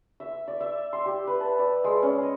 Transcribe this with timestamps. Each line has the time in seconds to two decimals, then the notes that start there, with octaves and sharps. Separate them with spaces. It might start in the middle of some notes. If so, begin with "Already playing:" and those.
0.20 E5
0.48 D5
0.60 E5
0.93 C6
1.06 G4
1.27 B4
1.41 A5
1.59 D5
1.84 G#3
2.02 C#4
2.22 D#5